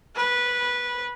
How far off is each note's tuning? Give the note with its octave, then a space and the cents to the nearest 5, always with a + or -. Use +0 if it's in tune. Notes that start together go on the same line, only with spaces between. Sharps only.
B4 -15